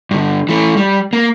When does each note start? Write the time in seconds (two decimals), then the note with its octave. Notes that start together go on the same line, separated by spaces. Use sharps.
0.11 G2 D3
0.49 E3 A3
0.77 G3
1.13 A#3